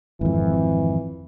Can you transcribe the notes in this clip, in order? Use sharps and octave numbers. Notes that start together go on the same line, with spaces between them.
G#1 F2 E3